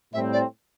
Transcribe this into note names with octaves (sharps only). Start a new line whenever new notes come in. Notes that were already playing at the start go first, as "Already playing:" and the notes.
A2 G3 C4 E5
D5